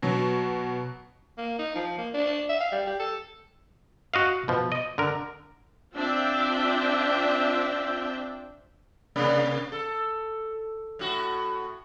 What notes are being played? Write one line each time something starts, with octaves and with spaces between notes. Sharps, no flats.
B2 F#3
A#3
D#4
F3
A#3
D4
E5
F5
G3
G4
A4
F#4 D#5 F5
B2 F3
D#5
D3 A#4
C4 D4 F4 E5 G5
C3 A#3 C#4
A4
A2 F#4